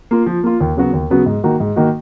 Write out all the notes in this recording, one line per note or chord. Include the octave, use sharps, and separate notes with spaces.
A#3 F4
F3
A#3 F4
D#2
C#3 F#3 B3 F#4
D#2
C#3 F#3 B3 F#4
G#2
D#3 A#3 D#4 F#4
G#2
D#3 A#3 D#4 F#4